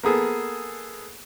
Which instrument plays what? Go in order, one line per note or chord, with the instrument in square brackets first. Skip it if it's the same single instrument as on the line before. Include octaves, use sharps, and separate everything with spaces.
[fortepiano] A#3 B3 G#4 A4